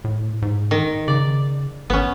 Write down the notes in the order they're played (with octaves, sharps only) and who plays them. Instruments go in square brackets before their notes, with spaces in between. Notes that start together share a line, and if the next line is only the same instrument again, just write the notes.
[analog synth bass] A2
G#2
[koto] D#3
[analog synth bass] C#3 [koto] D5
[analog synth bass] G#1 [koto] B3 C#4